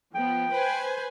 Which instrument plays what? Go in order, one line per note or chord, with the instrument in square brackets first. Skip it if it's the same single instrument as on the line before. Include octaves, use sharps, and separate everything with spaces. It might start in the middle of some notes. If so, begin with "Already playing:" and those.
[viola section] F3 B3 [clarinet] G5
[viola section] B4 C5 G#5